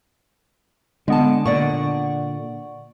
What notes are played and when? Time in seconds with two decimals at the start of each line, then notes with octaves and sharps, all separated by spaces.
1.08 D3 G#3 B3 A5
1.45 A#2 D3 D5 F#5 C#6